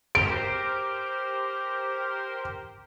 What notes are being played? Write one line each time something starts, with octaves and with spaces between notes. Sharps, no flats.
G4 A#4 C5 D7